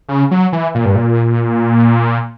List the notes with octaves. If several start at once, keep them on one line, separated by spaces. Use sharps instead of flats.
C#3
F#3
E3
A#2
G2
A#2